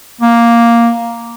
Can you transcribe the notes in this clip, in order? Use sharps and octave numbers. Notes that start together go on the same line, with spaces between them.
A#3